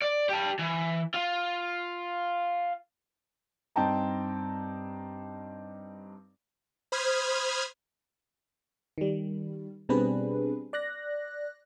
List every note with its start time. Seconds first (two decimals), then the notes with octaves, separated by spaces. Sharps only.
0.02 D5
0.29 G4 A5
0.59 E3
1.14 F4
3.76 G2 C4 D#4 G5 A5 A#5
6.92 C5 B5 D#6 F6 G#6
8.98 D#3 G3
9.89 B2 G3 C4 D4 G#4 B4
10.73 D5 F#6 A#6